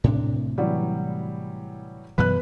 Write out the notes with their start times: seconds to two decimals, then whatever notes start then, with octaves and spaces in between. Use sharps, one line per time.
0.04 A2 C3 D4
0.58 E3 F#3 G3
2.18 F#2 B2 E3 B4 F#6